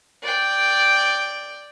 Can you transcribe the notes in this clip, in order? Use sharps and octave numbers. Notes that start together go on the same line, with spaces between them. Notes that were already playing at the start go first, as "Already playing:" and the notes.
D5 G5